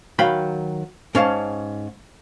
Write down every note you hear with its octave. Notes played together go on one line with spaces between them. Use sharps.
D#3 F#3 F5 G5 B5
G#2 C#4 F5 A5